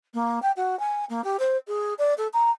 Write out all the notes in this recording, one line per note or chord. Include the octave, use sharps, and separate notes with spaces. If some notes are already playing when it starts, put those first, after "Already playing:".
A#3
G5
F#4
G#5
A#3
G4
C5
G#4
D5
A4
A#5